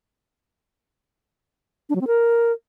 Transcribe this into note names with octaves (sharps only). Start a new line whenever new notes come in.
D4
F#3
C4
A#4